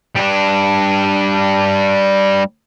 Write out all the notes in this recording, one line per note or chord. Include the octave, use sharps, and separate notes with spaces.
G3 D4